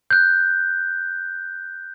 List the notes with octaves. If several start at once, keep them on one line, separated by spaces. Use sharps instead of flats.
F#6 G6